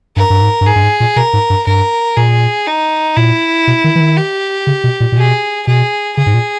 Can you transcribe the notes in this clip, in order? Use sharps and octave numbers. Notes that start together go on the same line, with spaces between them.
G2 A#4
G2
G#2
G2
G#2 G#4
G2
G#2
A#2
B2 A#4
G#2
G2
G2 A#4
A#2 G#4
D#4
A#2 E4
B2
D#3
E3
D#3
G4
C#3
B2
A#2
A#2
B2 G#4
B2 G#4
C#3 G#4
G#2
A#2